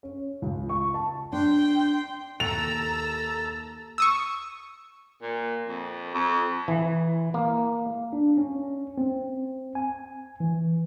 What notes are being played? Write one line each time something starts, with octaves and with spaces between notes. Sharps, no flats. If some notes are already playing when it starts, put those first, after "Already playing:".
C#4
C#2
C#6
A5
D4 G5 C6
D#2 A4 A#5 E6 F7
C#6 D#6 E6
A#2
F2
F2
E3
A#3
D4
C#4
C4
G#5
E3